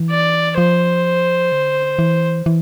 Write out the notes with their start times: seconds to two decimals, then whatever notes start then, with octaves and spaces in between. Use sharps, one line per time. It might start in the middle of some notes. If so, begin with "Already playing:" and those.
Already playing: E3
0.10 D5
0.58 F3 C5
1.52 D3
1.99 E3
2.46 E3